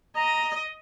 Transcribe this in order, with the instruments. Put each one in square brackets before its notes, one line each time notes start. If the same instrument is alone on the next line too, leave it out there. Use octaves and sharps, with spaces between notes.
[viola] D#5 [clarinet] A#5